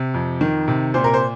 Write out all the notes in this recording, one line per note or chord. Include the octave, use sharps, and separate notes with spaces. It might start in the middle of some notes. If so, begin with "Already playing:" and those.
Already playing: C3
F2
D#3
C3
A#2 C5
A#4
C5